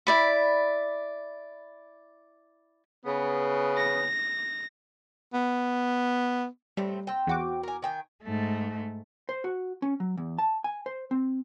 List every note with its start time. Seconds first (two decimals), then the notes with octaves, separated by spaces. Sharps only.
0.07 E4 D5 B5
3.05 C#3 B3
3.77 A#6
5.34 B3
6.77 A2 G3 A3 C4
7.07 C4 G5
7.27 E2 F#4 D6
7.63 A#4 G#5
7.82 D#3 G5 G#5
8.23 G#2 A3
9.29 C5
9.44 F#4
9.82 C#4
10.00 F#3
10.17 E2
10.38 A5
10.64 G#5
10.86 C5
11.11 C4